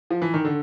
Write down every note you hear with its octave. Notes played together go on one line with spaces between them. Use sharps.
F3
E3
D#3
D3